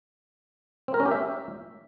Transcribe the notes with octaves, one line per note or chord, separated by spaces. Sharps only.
C4
A#4
C#4
G4
E5